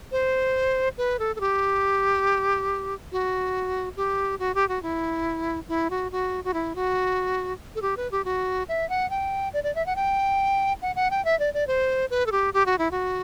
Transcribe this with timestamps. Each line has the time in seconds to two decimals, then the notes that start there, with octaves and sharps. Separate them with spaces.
0.12 C5
0.98 B4
1.19 A4
1.36 A4
1.40 G4
3.12 F#4
3.97 G4
4.39 F#4
4.55 G4
4.69 F#4
4.83 E4
5.69 E4
5.90 F#4
6.12 F#4
6.44 F#4
6.54 E4
6.75 F#4
7.75 A4
7.82 G4
7.97 B4
8.11 G4
8.25 F#4
8.69 E5
8.89 F#5
9.10 G5
9.53 D5
9.64 D5
9.75 E5
9.86 F#5
9.96 G5
10.82 F#5
10.96 F#5
11.11 G5
11.25 E5
11.40 D5
11.54 D5
11.67 C5
12.10 B4
12.27 A4
12.32 G4
12.54 G4
12.66 F#4
12.78 E4
12.91 F#4